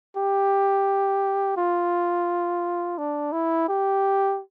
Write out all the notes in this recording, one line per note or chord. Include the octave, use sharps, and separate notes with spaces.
G4
F4
D4
E4
G4